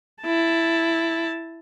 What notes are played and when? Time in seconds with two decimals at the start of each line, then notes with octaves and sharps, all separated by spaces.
0.22 E4 A5